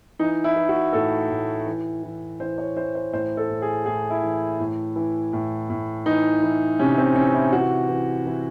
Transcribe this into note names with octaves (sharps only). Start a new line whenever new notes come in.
E3 D#4
E4
E3
F#4
A2 A4
A2
E3
E3
E3 C5
C#5
E3 C5
C5
A2 C5
A4
A2
G#4
A2 G#4
E4
E3
A2
E3
A2
A2
E3 D#4
E3
C3 C#4
C4
E3 C#4
E4
E3 F#4
E3
E3